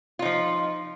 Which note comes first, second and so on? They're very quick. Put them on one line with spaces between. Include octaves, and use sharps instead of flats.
F4 D#4 F3